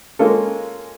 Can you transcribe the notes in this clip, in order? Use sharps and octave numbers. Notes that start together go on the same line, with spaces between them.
G#3 A#3 C#4 F4 A4